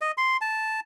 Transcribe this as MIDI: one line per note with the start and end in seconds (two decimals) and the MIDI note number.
0.01 0.12 75
0.17 0.37 84
0.41 0.80 81